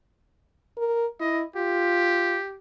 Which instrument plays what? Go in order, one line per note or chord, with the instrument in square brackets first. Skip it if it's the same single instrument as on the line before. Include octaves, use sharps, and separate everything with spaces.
[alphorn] A#4
[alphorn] E4 [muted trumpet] D#5
[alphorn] F4 [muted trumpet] G4